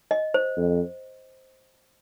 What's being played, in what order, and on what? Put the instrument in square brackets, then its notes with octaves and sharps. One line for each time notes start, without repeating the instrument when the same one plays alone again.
[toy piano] D#5
C5
[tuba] F2